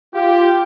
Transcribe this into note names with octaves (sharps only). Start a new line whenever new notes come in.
F4 G4